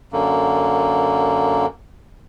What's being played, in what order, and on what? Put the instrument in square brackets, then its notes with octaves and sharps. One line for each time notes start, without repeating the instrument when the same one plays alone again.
[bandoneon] F#2 D3 A#3